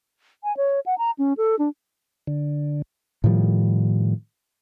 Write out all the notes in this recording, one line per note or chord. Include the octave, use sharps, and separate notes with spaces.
G#5
C#5
F#5
A#5
C#4
A4
D4
D3
A2 D#3 F3 G3